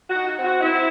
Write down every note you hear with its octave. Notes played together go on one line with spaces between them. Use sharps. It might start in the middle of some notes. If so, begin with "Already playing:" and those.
D#4 F#4
F#4
C4
F#4
C4 E4